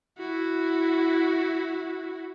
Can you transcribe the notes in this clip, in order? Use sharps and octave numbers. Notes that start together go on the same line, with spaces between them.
E4 F#4